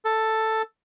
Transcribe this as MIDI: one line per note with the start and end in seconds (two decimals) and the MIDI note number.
0.05 0.62 69